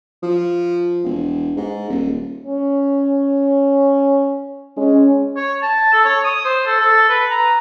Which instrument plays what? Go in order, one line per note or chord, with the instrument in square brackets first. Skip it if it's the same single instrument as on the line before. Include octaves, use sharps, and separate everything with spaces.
[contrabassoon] F3
E1
G#2
D#1
[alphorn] C#4
[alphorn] G#3 [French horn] C#4
[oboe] C#5
A5
A4
C#5
D#6
C5
A4
A4
B4
A#5